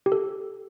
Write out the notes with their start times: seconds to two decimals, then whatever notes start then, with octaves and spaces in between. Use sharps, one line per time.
0.06 G4
0.12 A4